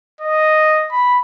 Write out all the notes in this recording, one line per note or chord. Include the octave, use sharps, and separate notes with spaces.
D#5
B5